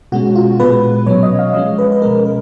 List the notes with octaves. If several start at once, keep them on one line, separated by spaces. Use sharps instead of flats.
B2 G#3 C#4 F#4
F4
A#2 G#3 B3 B4
B2 F#3 C#4 C#5
D#5
F5
F3 G#3 C#4 D#5
B4
B4
B2 G#3 C#4 A#4
A#4